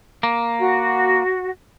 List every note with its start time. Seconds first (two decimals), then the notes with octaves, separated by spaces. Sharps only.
0.23 A#3
0.59 F#4